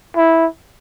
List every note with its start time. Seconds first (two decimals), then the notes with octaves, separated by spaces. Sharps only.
0.17 E4